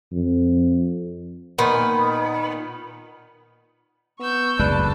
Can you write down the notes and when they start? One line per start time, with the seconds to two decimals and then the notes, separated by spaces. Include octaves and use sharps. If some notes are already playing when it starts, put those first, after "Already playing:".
0.12 F2
1.58 A#2 D#3 B3
4.20 B3 C#6 E6 G6
4.59 F#1 D2 G#3 B4 D5 A5